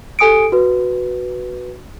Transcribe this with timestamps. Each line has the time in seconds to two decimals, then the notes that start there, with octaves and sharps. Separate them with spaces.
0.19 G4 A4 G#5 D#6 C#7 D7
0.52 F#4 B4